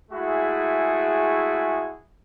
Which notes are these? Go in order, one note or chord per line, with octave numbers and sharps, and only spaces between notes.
G#3 A3 E4 F#4 G#4